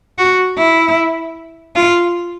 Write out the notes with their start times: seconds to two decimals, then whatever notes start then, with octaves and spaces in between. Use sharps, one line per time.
0.18 F#4
0.58 E4
1.76 F4